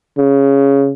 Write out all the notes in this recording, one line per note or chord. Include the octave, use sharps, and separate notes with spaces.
C#3